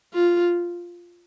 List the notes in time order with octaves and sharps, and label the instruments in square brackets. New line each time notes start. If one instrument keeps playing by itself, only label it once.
[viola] F4